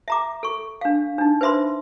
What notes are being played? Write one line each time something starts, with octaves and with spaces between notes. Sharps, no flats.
E5 A#5 D6
A4 C#6
D4 F5
D4 D#4
B4 C5 E5 B5 C6